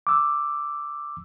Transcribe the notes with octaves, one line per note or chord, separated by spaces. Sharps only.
D6 E6